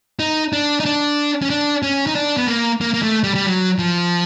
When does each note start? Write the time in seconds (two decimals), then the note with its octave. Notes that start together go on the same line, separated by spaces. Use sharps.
0.19 D#4
0.53 D4
0.80 D#4
0.85 D4
1.42 C#4
1.50 D4
1.83 C#4
2.07 D#4
2.15 D4
2.37 B3
2.48 A#3
2.81 A#3
2.94 A#3
3.03 A3
3.24 G3
3.35 G3
3.46 F#3
3.79 F3